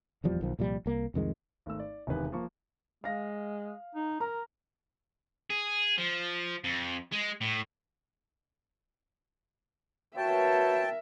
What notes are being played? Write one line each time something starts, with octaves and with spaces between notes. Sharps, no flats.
D#1 E2 F3 G3
B1 D#3 F3
C2 A#2 F3 G3
C2 A#3
C2 F2 D#3 G#3
G#1 A3 E6
D5
E1 C3 D#3 B4 G#5
F3 A#3 C#6
G#3 F5 A#6
D#4
A#4 A#5
G#4
F3
F2
G#3
A2
F#4 A#4 B4 C#5 E5 G5 A5